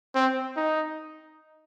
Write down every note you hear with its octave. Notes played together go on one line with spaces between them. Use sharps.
C4
D#4